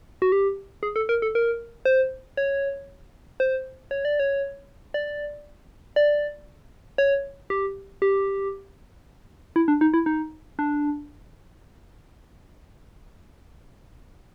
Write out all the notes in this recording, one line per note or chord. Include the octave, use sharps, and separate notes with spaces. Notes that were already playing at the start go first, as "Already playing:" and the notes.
F#4
G4
G#4
A4
A#4
A4
A#4
C5
C#5
C5
C#5
D5
C#5
D5
D5
C#5
G4
G4
E4
D4
D#4
E4
D#4
D4